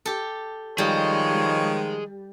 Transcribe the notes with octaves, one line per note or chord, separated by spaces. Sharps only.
G4 A4
D#3 F3 G3 G#4 C#5 D#5